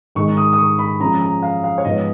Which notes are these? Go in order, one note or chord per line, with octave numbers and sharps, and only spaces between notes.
G#2 D#3 G#3 D#4 C#6
D#6
D#6
C#6
B5
F#2 F3 G#3 C#4 A#5
A#5
F5
F5
C#5
G#2 F3 G#3 B3 D#5